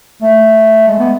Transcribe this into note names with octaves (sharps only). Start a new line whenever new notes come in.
A3
G#3
B3